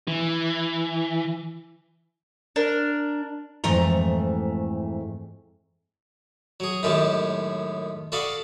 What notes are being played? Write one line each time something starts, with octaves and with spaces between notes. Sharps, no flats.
E3
D4 A#4
F2 G#2 E3 A3 A#5
F#3 G#4
F#2 A2 D#3 G#3 G4 A5
F#4 A4 D5 F5 B5 D#6